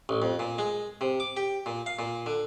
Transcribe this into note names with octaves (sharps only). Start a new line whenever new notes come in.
A1
F2
A#2
G#3
C3
D6
G4
A#2
F5
A#2
D3